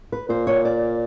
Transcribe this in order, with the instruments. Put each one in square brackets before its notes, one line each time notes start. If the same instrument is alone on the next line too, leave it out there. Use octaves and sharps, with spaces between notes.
[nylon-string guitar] B4
[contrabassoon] A#2 [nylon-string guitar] C5
[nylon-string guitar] C#5
D5